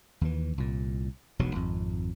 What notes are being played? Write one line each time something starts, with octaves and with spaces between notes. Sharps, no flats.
D#2 E3
C2 A#2
E1 B1 B2 F#3
G#1 F2